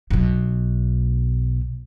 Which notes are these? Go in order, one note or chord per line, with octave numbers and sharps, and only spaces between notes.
B1 B2